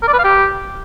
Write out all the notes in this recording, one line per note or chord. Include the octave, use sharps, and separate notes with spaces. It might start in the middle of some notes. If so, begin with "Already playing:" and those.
A#4
D5
B4
F5
G4